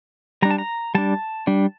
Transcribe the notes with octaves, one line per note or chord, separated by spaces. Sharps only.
G3 D4 A#5
A5
A#5
G3 D4 A5
G3 D4